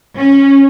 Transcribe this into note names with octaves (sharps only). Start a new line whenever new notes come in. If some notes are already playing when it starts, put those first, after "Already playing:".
C#4